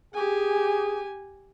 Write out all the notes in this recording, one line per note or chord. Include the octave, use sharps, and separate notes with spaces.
G4 G#4 G#5